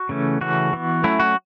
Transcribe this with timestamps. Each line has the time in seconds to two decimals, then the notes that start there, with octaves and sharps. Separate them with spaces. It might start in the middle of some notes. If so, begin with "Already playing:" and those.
Already playing: F#4
0.09 C#3 E3 A3 C#4
0.41 C#3 E3 A3 C#4 F#4
0.73 E3 B3
1.04 F#3 A3 C#4 E4
1.20 F#4